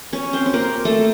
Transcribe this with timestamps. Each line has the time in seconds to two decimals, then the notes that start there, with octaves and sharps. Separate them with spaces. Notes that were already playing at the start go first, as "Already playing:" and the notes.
0.13 C#4 C#5
0.33 C4 C5
0.46 C5
0.54 A#3 A#4
0.85 A3 A4